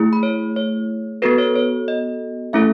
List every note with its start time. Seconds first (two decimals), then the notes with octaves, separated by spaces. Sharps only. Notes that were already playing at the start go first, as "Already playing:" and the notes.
Already playing: A3 E4 G#4
0.13 B5
0.23 C#5
0.56 C#5
1.22 B3 F#4 A4 B4
1.38 C#5
1.56 C#5
1.88 D#5
2.53 A3 C#4 E4 A4 E5